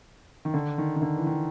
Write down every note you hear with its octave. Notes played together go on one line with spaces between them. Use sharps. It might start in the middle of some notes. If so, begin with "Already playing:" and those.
D#3
D3
D#3
D#3
D3
E3
D#3